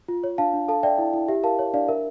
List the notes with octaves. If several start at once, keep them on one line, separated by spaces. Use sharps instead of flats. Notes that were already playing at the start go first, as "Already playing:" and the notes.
F4
C#5
D4 F5 A5
D4
A4 F5 A5
D5 E5 G5
E4
E4
G4 E5
A#4 F5 A5
C#5
D4 D5 F5
A#4 E5